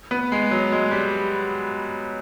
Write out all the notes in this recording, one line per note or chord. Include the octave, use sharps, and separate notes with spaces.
B3
G#3
F#3
G#3
G3